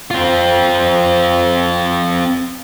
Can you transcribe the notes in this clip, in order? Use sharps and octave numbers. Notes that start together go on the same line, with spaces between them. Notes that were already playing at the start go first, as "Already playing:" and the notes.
C4 F4